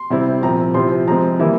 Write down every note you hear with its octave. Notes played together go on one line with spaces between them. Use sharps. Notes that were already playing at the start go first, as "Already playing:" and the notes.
Already playing: C6
C3 G3 C4 E4
A#2 F3 C4 A#5
C3 F3 C4 E4 C6
F3 G#3 C4 A#5
E3 G3 A#3 E4